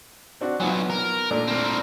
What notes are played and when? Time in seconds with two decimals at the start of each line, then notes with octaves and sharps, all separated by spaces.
0.41 C4 D4 F#4
0.60 B1 F#3 B3 F4 G#5
0.90 A#4
1.31 A#2 A3 D4
1.47 C4 A#4